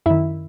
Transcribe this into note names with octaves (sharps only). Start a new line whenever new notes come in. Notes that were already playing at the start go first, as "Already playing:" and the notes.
F#2 D#3 E4 E5